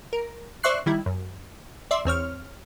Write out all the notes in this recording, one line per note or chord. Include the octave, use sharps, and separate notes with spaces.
A#4
C5 D5 E5 C#6 F#6 C7
D#3 G3 E4
F#2
D5 E5 C6
E2 C4 C#5 F6